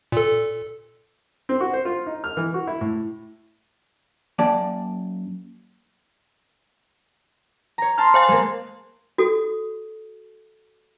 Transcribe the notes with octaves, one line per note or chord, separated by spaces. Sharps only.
A#2 A4
C4
F#4
C5
F4
D#4
F6
E3
F#4
E4
A2
F#2 A#3 D5 G5 A5
C#5 A#5
A5 C6 F6
C5 F5 G#5
G#3 A#3
F#4 A4